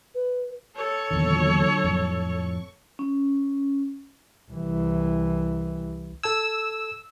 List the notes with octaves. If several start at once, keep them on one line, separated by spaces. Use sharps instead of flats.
B4
A4 C#5
E2 A#2 D3 D#3 F#3
F2 A2
C#6
C#4
C2 E3
A4 A5 E6 G#6